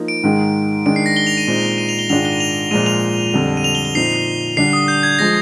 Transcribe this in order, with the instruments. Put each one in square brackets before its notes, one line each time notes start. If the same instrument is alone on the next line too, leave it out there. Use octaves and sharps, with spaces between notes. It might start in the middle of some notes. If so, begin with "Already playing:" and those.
Already playing: [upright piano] F3 A#3 D#4
[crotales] D7
[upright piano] G#2 D#3 G#3
[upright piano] D#3 G#3 D4 [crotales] D7
[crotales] C7
A#6
G7
F7
D#7
[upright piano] A#2 G#3 C4 D#4
[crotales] D#7
F7
G7
[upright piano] G#2 D#3 G#3 D4 F4 [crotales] F7
[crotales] G7
D#7
F7
[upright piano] A#2 F3 G#3 [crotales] D#7
[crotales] F7
[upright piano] F2 D3 G3
[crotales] D#7
F7
G7
G7
[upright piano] A#2 F3 C4 D#4 [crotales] C7
[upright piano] D3 G3 D4 [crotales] C7
[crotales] D#6
G6
G#6
[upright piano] F3 G#3 [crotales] A#6